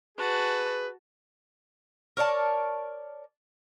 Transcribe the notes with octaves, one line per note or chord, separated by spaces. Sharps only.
F#4 G#4 B4 A5
A#4 C#5 D5 A5